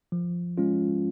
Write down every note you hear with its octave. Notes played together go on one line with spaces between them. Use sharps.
F3
G#3 C#4 F4